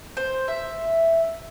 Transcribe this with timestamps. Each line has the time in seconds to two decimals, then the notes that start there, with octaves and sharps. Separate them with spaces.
0.17 C5
0.48 E5